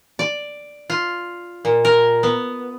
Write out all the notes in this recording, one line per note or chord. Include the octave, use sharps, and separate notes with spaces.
D5
F4
A#2
A#4
B3